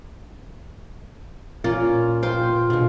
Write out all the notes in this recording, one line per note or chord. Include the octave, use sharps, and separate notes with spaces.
A#2 A#3 C#4 F4
F4 C5 G5 C6 D6
B2 D3 G#3